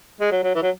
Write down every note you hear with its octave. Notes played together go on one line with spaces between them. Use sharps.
G#3
F#3
F#3
E3
F#3